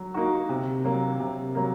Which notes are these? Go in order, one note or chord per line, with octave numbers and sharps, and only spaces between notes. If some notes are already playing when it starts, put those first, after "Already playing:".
Already playing: F#3
A#3 D#4 F#4
C3
F#3 A#3
C3
F#3 A#3